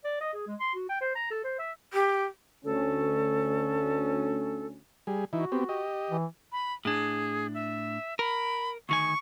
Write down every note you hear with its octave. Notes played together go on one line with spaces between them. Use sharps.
D5
D#5
G#4
G#3
C6
F#4
G5
C5
A#5
A4
C5
E5
G4
D2 C#4 A4
G3 G#4
E3 D#4 E4 F#4
B3 C4 G4
G4 D#5
E3
B5
A2 D4 G#4
E5
A#4 B5
D2 D#3 G#5 C#6